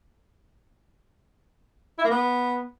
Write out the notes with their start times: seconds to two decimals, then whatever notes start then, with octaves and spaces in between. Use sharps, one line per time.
1.98 E4
2.04 A#3
2.10 B3